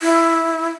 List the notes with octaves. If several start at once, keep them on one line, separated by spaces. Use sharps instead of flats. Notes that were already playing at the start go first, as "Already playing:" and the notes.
E4